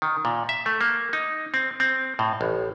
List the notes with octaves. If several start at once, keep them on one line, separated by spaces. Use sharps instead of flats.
D#3
A#2
E5
A3
A#3
D#4
C4
C4
A2
A1